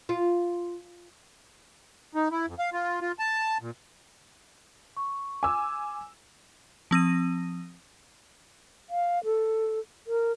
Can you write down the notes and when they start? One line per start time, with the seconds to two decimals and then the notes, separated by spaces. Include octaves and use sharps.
0.09 F4
2.15 D#4
2.31 E4
2.47 F2
2.59 F5
2.73 F4
3.01 F4
3.19 A5
3.61 A#2
4.97 C#6
5.43 G#5 D6 E6
6.91 F3 C4 D#6 D#7
8.90 F5
9.24 A4
10.07 A#4